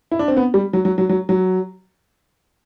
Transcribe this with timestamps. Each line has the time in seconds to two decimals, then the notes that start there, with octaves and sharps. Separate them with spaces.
0.12 E4
0.19 D4
0.28 C4
0.37 B3
0.54 G3
0.73 F#3
0.85 F#3
0.98 F#3
1.09 F#3
1.29 F#3